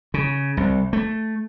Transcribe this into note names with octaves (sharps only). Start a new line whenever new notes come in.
C#3
C2
A3